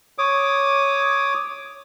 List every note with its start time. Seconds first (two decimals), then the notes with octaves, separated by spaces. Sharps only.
0.18 C#5 D6 D#6